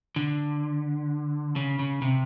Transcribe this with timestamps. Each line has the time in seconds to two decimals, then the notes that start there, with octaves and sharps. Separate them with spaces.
0.16 D3
1.56 C#3
1.79 C#3
2.02 C3